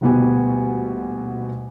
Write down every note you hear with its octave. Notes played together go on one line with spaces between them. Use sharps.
D#1 D2 B2 B3 G4 G#5